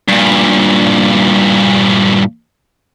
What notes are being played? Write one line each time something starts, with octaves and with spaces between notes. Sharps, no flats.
G2 A#2